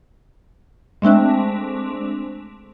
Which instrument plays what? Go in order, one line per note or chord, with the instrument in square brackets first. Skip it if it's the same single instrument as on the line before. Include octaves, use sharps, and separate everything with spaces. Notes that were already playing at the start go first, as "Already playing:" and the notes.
[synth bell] G#3 A3 C4 D4